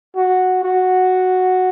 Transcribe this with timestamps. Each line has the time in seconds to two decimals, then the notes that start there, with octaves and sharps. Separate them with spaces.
0.16 F#4
0.64 F#4